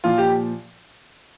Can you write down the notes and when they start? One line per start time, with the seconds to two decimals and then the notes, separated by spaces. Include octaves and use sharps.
0.04 A#2 F3 F4
0.18 G4